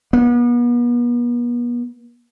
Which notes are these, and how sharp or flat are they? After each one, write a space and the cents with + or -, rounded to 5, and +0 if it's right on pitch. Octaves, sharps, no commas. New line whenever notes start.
B3 -40